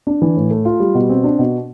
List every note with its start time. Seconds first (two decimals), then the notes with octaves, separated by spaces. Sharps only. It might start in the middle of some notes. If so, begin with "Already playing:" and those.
0.07 D4
0.22 E3
0.36 A2
0.51 A3
0.65 F4
0.80 G3
0.95 B2
1.09 C4
1.24 D4
1.39 B2